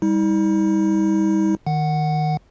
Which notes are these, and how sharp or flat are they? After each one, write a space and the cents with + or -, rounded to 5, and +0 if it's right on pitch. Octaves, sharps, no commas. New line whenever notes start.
G3 +20 D#4 +45
D#3 -5 F#5 +0